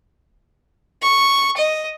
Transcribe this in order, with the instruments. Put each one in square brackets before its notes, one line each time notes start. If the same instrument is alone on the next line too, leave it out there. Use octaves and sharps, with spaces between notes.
[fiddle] C#6
D#5